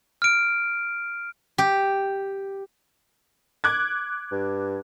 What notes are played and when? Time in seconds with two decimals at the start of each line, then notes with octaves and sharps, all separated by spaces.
0.22 F6 D7
1.58 G4
3.64 D6 F#6 G#6
4.32 G2